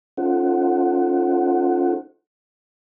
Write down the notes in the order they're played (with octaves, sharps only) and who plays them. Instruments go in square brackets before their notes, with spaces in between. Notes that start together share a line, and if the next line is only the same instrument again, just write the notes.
[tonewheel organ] C#4 D#4 F4 A4 C5 F#5